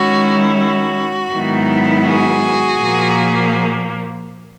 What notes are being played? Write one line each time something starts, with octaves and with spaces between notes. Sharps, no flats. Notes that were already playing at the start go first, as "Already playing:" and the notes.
Already playing: D#3 G#3 C#4 E4 F#4
F#4
G#2 D#3 F#3 B3 E4
F#4 G#4
A#2 F3 A#3